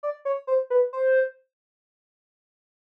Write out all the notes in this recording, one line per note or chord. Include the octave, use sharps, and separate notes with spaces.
D5
C#5
C5
B4
C5